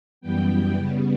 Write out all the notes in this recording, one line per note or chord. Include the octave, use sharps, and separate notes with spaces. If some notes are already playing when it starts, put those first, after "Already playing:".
F#2 E3 G3 B3 G5
C#3 G3 B3